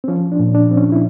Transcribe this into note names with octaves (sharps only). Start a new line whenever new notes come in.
C4
F3 C#4
D4
A#2
D4
F3 C4
C#4
E4